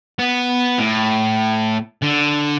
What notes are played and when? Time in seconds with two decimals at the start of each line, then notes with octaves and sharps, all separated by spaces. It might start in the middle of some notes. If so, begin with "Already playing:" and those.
0.19 B3
0.79 A2
2.03 D3